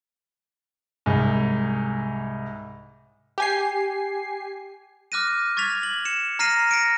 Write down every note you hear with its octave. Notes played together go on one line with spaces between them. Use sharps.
C2 G#2
G4 G#5 C7
D6 F6 F#6 A#6 D#7
C#6 G#6 A6 B6 F7
F#7
C#7 E7
A#5 F6 A#6 C7 D#7
A#6 C#7 D7